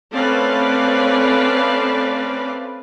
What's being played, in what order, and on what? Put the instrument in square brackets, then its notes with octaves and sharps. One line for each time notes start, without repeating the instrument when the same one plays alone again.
[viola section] A3 C4 C#4 B4 D5 F5